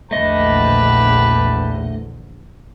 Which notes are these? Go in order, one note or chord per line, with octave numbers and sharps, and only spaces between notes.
A#1 E2 D3 A3 G4 B4 D#5 A5